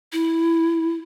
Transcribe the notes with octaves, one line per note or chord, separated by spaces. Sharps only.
E4